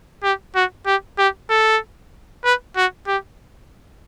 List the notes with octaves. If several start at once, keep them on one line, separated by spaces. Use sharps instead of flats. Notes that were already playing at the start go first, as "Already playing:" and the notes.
G4
F#4
G4
G4
A4
B4
F#4
G4